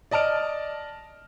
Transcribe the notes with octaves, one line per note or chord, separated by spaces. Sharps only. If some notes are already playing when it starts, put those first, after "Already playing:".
D5 D#5 A5 F6 D7